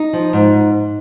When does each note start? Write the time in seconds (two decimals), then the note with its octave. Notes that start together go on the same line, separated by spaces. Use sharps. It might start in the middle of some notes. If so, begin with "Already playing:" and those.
Already playing: D#4
0.13 F3
0.33 G#2